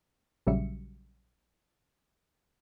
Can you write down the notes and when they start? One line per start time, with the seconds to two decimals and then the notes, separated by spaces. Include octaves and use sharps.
0.47 A#1 C#3 F#3 G3 E5 C#7